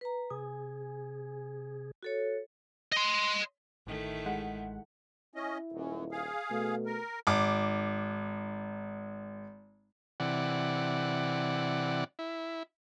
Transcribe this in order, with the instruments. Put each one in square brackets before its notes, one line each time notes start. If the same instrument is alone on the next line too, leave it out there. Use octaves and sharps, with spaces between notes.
[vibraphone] B4 A#5
[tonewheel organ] C3 G#4 [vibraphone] G#5
[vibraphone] F#4 A4 C#5
[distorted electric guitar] D#5 C6
[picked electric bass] A1 [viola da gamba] D#3 A3 E4
[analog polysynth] G#3 F#5
[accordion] C#4 D#5 [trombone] E4
[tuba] D#1 [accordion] F#2
[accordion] G#4 F5
[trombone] B2 [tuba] A3
[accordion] A#4
[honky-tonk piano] G#1 D6
[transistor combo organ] C3 E3 D5 F#5
E4